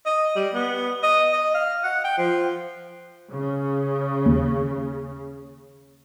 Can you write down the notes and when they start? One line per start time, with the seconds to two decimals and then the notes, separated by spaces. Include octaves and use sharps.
0.06 D#5
0.36 G3
0.54 B3
1.03 D#5
1.32 D#5
1.54 F5
1.84 F#5
2.04 G5
2.18 F3
3.31 C#3
4.26 D#2